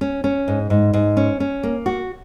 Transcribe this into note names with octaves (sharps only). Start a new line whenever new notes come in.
C#4
C#4
G#2
G#2
G#2
C#4
C#4
A#3
F#4